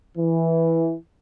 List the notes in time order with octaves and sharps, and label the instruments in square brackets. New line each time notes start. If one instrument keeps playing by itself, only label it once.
[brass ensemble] E3